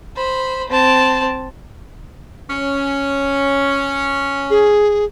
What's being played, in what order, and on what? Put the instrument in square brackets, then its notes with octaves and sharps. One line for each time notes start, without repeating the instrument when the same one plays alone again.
[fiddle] C5 B5
C4 A5
[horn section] C#4
[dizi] G#4